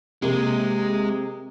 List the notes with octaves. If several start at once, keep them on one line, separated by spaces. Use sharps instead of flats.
C3 G#3 A#3